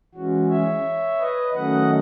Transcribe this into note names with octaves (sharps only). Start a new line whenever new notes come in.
E3 G#3 C#4 F#4
C#5 E5
B4 D#5
D#3 F#3 A3 C#4 D#5 F#5